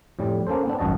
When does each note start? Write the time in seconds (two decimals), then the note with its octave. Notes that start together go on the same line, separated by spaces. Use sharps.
0.19 F2 A2 G3
0.47 A#3 C#4 A4 C5
0.65 B3 C4 D4
0.79 G#1 F#2 F#4 D#5 A5